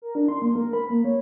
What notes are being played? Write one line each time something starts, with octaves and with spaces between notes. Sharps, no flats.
A#4
D4
C6
A#3
A#4
B5
A#3
C#5